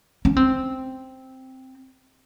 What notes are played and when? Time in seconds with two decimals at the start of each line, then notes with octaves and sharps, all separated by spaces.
0.25 C#4
0.37 C4